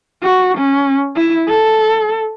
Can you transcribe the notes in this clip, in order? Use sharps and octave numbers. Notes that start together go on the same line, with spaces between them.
F#4
C#4
E4
A4